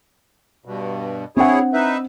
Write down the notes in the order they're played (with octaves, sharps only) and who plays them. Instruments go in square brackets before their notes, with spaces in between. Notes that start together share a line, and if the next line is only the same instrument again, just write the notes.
[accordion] G2 B2
[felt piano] C4 D4 F#5 [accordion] E4 G#4 C#5
[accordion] D#4 B4 E5